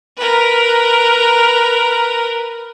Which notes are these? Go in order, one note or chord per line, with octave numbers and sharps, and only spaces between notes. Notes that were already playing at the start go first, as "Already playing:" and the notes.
A#4 B4